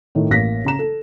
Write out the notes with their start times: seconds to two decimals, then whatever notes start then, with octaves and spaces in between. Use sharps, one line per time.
0.15 A2 D#3
0.30 A1 A#3 A#6 B6
0.65 C#3 A#5 E7
0.79 A4